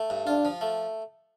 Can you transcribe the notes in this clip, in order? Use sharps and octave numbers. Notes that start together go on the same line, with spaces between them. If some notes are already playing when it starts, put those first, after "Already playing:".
Already playing: A3
G2
D4 F4
F3
A3